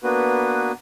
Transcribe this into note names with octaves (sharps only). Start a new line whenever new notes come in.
A#3 B3 D4 F#4 B4